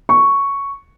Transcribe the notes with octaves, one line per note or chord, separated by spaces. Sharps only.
C#6